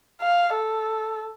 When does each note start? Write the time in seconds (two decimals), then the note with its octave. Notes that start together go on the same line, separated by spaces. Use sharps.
0.21 F5
0.54 A4